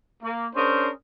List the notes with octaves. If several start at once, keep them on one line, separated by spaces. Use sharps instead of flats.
A#3
C#4 D4 G#4 A#4 C5